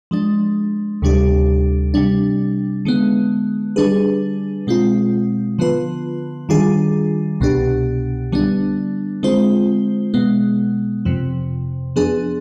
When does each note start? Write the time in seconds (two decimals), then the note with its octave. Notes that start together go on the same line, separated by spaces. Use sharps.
0.11 F3 G#3 D4
1.02 D2 C3 G3 D4 G4
1.94 C3 G3 D4
2.85 D3 G#3 B3
3.76 D3 G3 D4 G#4 B4
4.67 B2 G#3 C4 F4
5.59 D3 F3 B3 F4 B4
6.49 D#3 G3 D4 F4 G#4
7.41 C2 B2 B3 D4 G4
8.32 D3 G3 B3 D4
9.23 D3 G#3 C4 F4 C5
10.14 B2 G#3 B3
11.05 F2 C3 F3
11.96 F3 B3 D4 G#4